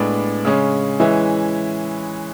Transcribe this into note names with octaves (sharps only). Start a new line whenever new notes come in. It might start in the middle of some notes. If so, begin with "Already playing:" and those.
Already playing: A2 G#3 B3 D4
C#3 G#3 C#4
E3 G#3 C#4 E4